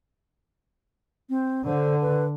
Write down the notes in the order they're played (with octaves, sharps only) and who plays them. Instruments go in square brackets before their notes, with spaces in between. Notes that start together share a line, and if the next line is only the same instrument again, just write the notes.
[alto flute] C4
[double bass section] D3 [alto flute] C5
[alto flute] B4